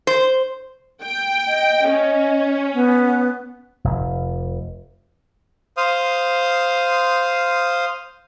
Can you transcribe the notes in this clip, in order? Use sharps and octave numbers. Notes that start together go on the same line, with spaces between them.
C5
G5
D#5
C#4
B3
F1
C5 F5 D#6